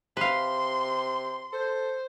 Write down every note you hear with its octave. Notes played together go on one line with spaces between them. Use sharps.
C3 B4 F5 C6
A4 C5